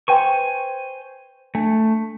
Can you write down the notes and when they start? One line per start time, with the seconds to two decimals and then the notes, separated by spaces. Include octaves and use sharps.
0.08 B4 C5 G5 G#5 C6 C#6
1.55 A3 D4